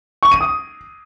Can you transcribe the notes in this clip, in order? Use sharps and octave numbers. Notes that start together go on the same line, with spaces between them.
C#6
D#7
D#6